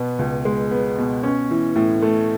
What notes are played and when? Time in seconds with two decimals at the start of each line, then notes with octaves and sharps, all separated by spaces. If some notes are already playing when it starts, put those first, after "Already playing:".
Already playing: B2 B3
0.19 C#2
0.45 G#3
0.71 B3
0.98 B2
1.23 C#4
1.51 E3
1.76 A2
2.02 A3